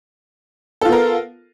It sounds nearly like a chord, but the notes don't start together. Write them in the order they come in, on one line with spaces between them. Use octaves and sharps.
A4 F4 B3 A#4